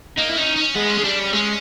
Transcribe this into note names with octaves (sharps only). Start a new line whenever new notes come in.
A#3 D#4
E4
C#4 D#4
C#4
G#3 B3
C#4
G#3
G3 D4
C#4
G#3 C#4